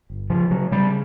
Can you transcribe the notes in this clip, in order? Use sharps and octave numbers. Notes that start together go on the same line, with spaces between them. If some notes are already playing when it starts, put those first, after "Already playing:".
G1
C#3 F3
C#3 F#3
C#3 G3